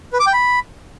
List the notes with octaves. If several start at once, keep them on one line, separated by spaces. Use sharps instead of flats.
B4
D6
G5
B5